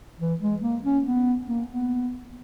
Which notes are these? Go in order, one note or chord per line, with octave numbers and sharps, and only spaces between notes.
E3
G#3
A#3
C#4
B3
A#3
B3